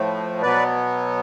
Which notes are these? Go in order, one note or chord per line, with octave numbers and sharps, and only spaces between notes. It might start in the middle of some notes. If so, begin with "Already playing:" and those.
Already playing: A2 F3 A3
B2 F#3 B3 B4 D5